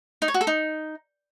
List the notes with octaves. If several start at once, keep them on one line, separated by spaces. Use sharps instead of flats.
D#4
C#5
F#4
A4
D#4